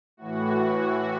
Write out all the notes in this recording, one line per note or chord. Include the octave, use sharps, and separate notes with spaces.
A2 E3 F#4